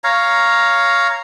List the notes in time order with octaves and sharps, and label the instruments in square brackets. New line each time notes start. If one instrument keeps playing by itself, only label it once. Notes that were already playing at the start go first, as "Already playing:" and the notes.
[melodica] C#5 F5 A#5